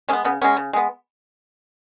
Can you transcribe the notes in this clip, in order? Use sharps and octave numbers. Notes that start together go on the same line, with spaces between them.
G#3 B3 C#4
C#3 B3
G#3 B3 C#4
C#3
G#3 B3